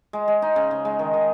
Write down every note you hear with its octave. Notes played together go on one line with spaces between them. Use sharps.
G#3
G#3
D#4
C#3
C#3
G#3
D#3
D#3